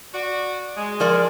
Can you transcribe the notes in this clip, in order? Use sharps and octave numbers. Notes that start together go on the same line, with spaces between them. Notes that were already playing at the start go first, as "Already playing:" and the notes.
F#4 D5
G#3
F3 A#4 D5